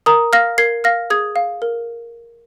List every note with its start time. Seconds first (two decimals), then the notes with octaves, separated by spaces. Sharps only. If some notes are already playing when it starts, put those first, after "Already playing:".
0.06 A#4 A#5 D#6
0.33 F5 F6 A#6
0.58 A#4 G#6 C7
0.84 F5 F6 A#6
1.10 G#4 D#6 G#6
1.36 F5
1.62 A#4